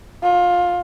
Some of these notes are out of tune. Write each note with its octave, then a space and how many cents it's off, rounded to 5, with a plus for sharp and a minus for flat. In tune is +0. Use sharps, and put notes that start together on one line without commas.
F4 +20